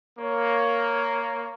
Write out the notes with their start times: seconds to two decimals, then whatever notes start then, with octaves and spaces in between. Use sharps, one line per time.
0.19 A#3 C#5